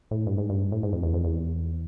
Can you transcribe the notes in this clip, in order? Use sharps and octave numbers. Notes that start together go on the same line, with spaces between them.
A2
G2
G#2
G2
A2
G#2
F2
E2
F2
E2